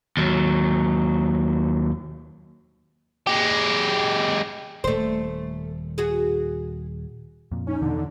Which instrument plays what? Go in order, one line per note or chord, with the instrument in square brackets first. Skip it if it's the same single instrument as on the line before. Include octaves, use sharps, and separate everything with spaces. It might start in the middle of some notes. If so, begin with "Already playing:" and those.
[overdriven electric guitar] D#2 F#3
G#3 G4
[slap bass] D#1 [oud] A3 C5
[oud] F#4 G#4
[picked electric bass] F2 A#2
[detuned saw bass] C#4 [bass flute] D#4
[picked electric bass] E2 B2 [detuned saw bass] D3